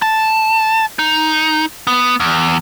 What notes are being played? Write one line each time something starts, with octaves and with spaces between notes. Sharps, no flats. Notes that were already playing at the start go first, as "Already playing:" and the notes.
A5
D#4
B3
E2